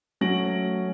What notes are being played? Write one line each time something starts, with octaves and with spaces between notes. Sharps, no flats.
F#3 A3 C#4 A#6 D7 F#7